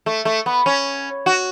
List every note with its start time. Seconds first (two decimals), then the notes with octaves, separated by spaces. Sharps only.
0.06 A3
0.25 A3
0.46 B3
0.66 C#4
1.26 F#4